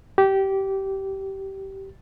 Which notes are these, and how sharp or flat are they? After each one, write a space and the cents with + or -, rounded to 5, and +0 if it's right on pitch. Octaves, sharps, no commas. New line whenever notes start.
G4 -20